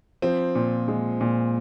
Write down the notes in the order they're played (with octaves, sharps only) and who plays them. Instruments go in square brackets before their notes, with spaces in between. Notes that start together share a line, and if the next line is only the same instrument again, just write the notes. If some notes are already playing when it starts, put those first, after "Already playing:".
[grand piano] F3 C4
A#2
G#3
A#2